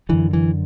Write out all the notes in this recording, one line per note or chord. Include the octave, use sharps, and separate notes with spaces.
F#2 D3 E3
E3